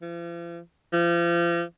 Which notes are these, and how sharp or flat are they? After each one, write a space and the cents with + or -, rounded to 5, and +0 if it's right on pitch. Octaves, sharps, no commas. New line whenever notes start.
F3 -45
F3 -35